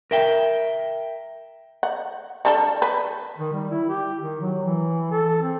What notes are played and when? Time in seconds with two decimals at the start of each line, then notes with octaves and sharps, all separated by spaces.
0.11 A#4 E5 G5
1.83 F#5
2.45 G3 D4 A4
2.82 B4
3.38 D#3
3.52 G3
3.70 E4
3.89 G4
4.21 D#3
4.41 F#3
4.63 E3
5.11 A4
5.42 C4